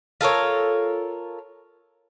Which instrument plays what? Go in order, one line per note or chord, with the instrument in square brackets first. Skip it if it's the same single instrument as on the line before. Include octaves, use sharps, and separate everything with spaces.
[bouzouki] F4 A4 A#4 C#5